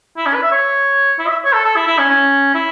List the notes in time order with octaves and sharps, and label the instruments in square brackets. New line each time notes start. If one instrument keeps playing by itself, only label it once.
[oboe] E4
C#4
B4
E5
C#5
E4
E5
C#5
A4
A4
E4
E4
C#4
C#4
E4